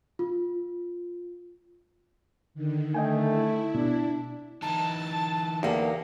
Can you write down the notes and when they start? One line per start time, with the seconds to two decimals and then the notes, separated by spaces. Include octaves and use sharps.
0.19 F4
2.54 D3 D#3
2.94 A3 D#5 G5 G#5
3.28 E4
3.75 B2 D4
4.62 E3 D#4 A5
5.63 E2 A#3 G4